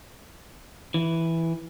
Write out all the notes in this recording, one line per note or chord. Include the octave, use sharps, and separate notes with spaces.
E3